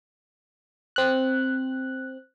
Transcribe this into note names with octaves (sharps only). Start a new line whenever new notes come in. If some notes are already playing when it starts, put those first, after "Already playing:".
C4 F#6